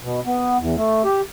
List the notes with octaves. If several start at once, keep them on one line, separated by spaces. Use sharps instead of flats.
B2
B3
E2
A3
G4